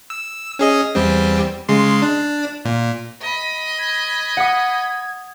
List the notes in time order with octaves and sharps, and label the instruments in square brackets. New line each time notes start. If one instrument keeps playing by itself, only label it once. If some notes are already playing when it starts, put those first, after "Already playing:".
[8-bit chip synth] E6
C#4 G#4 D#5
E2 G3 C4
C#3 G#3 C6
D4
A#2
[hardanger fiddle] D#5 B5
[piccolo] G#6
[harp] F#5 D#6